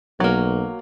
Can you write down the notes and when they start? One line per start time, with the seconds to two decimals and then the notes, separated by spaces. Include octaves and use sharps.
0.20 B1 F#3 A#3